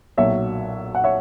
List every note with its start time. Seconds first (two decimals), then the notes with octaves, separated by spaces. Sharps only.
0.17 B1 A#2 F#3 C#5 E5
0.95 F#5
1.04 C#5 E5